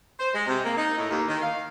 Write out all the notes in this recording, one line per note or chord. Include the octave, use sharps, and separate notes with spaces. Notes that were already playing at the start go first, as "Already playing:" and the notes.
C5
G#3
C3
A#3
D#4
A2
D#2
D#3
F5